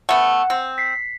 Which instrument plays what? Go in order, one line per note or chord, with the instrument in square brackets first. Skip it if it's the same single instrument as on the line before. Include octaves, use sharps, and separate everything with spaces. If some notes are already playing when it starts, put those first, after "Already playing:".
[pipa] A3 B3 [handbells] F#5
[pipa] C4
[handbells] B6 C7